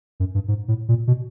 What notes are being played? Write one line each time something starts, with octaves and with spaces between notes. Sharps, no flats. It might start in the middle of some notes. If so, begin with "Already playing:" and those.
F#2
G2
G#2
A2
A#2
B2